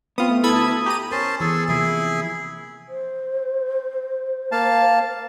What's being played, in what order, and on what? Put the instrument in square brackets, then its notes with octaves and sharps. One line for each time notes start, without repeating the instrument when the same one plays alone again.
[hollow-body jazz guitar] B3 [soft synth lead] C4 [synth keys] F4 D#6
[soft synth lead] A3
[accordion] D2 E4 A5 [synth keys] A4 B5 G#6 [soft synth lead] D#6
[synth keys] G4 D#7 [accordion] A#5 B5
[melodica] C#4 C5 A5 [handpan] A#4
[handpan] E3 B3 [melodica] G#4 A4
[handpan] C3 F3 A#3 [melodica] E4 G#4
[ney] C5
[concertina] A#3 F5 A5